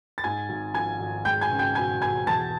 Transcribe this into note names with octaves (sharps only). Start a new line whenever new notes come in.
A6
G#2 G#5 G#6
G#1
F3 G#5 G#6
G#1
G#3 G5 G6
G#5 G#6
C#2
G5 G6
B2 G#5 G#6
B2 G#5 G#6
E2 A5 A6